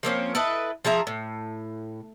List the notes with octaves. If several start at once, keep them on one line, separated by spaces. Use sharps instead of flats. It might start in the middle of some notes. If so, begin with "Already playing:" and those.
F3 A#3 C4 C#4
E4 A4 B4 D#5
F3 G#4 E5 A#5
A2